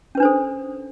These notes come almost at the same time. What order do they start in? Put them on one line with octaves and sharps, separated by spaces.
C#4 B4 D4 C5 A4